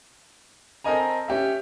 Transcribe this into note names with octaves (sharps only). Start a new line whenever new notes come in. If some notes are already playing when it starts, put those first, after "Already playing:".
C4 A4 A#4 D#5 G#5 A#5
C#4 G4 E5